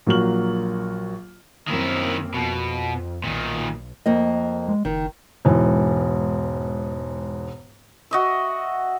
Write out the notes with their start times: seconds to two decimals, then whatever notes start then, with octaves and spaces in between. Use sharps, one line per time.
0.07 A#1 F#3 A#3 F#4 F6 F#7
1.68 F#2 D#3 A#3 C4 E4
2.34 F2 B2
3.24 B1 A#2 D#3
4.06 F2 A#3 D#5
4.69 G#3
4.85 F#1 D#3
5.45 E1 G#2 E3
8.11 F#4 D#5 E5